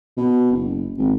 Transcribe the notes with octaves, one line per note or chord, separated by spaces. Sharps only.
B2
F#1
G#1